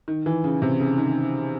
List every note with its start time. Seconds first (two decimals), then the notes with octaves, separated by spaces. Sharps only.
0.08 D#3
0.26 E3
0.44 C#3
0.62 C3
0.80 C#3
0.98 D#3